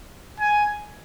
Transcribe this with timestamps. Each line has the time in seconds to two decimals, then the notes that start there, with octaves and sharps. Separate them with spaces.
0.40 G#5